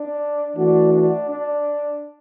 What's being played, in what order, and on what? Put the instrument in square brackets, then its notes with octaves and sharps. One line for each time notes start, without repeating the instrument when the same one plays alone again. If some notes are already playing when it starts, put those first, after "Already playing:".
Already playing: [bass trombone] D4
[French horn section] E3 A3 F#4 [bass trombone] D4
[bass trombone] D4
D4